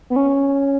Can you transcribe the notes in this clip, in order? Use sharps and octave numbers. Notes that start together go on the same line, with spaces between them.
B3
C#4